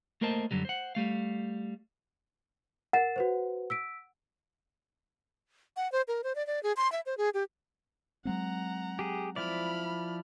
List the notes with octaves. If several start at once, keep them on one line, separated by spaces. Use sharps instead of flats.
A3 A#3 A#4 C5 D#5 A5
F#2 D3 E3 F#3 G3
C5 F#5
G3 A3 F5
A#4 F#5 A6 E7
F#4 B4 C5
E6 B6 D7
F#5
C5
A#4
C5
D5
D5
G#4
C6
E5
C5
G#4
G4
F#3 G#3 C4 F#5 A#5
G4 G#4
F3 E4 D5 B5 F6